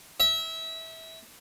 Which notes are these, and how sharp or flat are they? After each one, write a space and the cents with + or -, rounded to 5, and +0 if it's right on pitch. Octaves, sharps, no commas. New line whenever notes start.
E5 -25